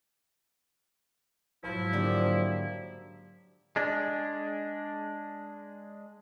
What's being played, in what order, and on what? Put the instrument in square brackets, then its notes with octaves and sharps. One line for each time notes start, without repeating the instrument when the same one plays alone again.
[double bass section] G#2 F#3 [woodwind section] F3 E4
[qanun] D3 A#3 G4
[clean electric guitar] G#3 D4